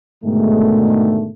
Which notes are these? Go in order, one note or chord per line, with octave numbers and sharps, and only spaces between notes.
G#2 B2 D3 D#3 G#3 A3